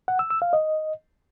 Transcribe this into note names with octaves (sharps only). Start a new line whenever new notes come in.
F#5
E6
E6
F5
D#5